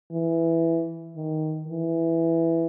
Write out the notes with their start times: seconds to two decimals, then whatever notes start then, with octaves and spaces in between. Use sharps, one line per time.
0.11 E3
1.16 D#3
1.68 E3